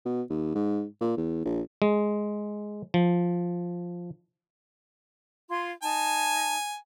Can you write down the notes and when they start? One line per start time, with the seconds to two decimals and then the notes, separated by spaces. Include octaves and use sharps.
0.05 B2
0.30 D#2
0.55 G#2
1.01 A#2
1.17 E2
1.45 A#1
1.82 G#3
2.94 F3
5.50 F4 C6 G#6
5.83 D#4 G#5 A5